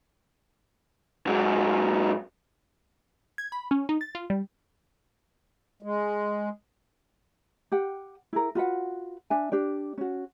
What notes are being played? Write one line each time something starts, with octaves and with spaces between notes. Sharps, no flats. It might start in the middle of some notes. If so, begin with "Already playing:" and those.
G#2 F#3
G#6
B5
C#4
D#4
A6
F4
G3
G#3
G4 F#5 G5
E4 G#4 A#4
F4 F#4 B4 F#5
D4 E5 G#5
D4 G4 D5
C#4 F#4